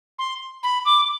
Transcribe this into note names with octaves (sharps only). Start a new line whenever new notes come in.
C6
B5
D6